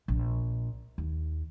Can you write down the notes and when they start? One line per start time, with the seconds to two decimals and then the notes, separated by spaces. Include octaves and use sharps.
0.08 A#1
0.98 D#2